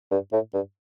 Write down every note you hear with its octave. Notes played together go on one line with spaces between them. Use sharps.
G2
A2
G2